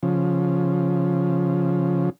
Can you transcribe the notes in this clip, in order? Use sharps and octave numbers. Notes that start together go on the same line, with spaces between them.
C#3 F3